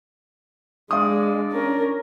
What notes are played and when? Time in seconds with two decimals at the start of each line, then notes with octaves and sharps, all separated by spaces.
0.91 G#3 D4 D5 F5 D#6
1.52 C#4 A#4